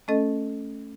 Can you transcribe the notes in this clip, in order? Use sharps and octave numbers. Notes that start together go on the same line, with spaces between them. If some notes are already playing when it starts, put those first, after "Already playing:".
A3 C#4 A4 D#5